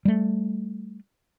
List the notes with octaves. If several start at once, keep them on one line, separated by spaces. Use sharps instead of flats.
G3 A3